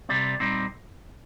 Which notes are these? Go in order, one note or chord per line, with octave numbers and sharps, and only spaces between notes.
C3 G3 C4 D5
A#2 G3 C4 D#4